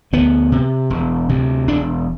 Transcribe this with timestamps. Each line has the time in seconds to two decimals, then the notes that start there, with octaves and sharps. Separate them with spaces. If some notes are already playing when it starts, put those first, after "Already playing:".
0.13 D2 B3
0.52 C3
0.90 E1
1.29 D2 C3
1.67 E1 D4